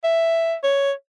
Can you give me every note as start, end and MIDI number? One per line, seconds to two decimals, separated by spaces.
0.04 0.56 76
0.63 0.92 73